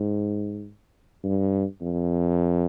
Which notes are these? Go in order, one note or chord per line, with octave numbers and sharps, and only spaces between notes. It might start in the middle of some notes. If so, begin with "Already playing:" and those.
Already playing: G#2
G2
F2